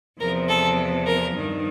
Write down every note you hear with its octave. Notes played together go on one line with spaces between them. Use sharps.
E2 C3 F3 A#4
A4
A#4
G2 D#3